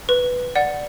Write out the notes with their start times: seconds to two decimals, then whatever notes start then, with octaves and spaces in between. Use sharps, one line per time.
0.09 B4
0.55 D5 F#5